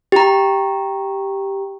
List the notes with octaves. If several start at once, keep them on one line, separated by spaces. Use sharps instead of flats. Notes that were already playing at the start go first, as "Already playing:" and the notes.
G4 A#5